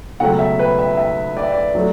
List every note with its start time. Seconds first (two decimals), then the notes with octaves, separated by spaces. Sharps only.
0.20 C#2 B2 F#3 A3 F#5
0.39 E5
0.59 B4
0.79 E5
0.97 E5
1.37 D5
1.43 E5
1.52 D5
1.75 F#3 A3